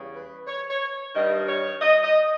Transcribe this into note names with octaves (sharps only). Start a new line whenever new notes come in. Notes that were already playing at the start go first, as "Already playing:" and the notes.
Already playing: E2 C#3 G3
B4
C#5
C#5
G2 D#3 G3 D#5
C#5
D#5
D#5